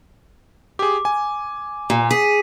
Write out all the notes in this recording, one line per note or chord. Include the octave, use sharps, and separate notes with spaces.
G4 G#4 D6
G#5
A#2
G#4 B6